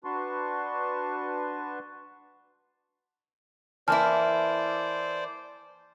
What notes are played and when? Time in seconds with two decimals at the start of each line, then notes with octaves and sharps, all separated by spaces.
0.04 D4 F#4 B4 A5 C6 C#6
3.88 E3 A#3 E4 C5 D5 G#5 A5 F6